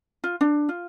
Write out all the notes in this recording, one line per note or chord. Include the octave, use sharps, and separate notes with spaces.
F4
D4
F4